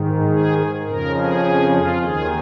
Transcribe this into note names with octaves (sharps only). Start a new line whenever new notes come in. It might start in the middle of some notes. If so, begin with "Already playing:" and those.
Already playing: G#2 D#3
G#4
F2 C#3 F3 A#4
G#4
F4
D#2 D#3 G#4